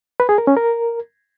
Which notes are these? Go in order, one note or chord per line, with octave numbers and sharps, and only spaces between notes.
B4
G#4
A#4
C#4
A#4